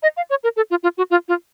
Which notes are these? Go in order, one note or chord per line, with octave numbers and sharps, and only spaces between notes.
D#5
F5
C#5
A#4
A4
F4
F4
F#4
F4
F4